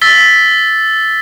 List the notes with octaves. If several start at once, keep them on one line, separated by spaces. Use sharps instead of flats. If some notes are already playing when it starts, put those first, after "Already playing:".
E6 A6 B6 G7